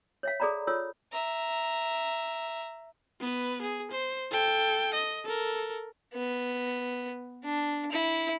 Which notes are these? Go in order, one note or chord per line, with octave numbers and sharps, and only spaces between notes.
C#5 E5 F5
G#4 A4 D5 A#5 B5
F4 A4 C#5 E6
E5 A#5
B3 B4
G#4
C5
A4 G5
D#5
A4 A#4
B3
D4
E4